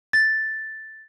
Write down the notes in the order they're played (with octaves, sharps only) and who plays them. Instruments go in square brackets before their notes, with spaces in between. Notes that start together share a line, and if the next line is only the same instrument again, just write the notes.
[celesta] A6